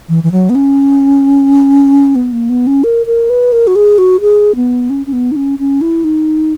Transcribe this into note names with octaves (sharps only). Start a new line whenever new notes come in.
E3
E3
F#3
B3
C#4
B3
A#3
B3
C#4
A#4
A#4
B4
A#4
F#4
G#4
F#4
G#4
B3
C#4
C#4
B3
D#4
C#4
C#4
E4
D#4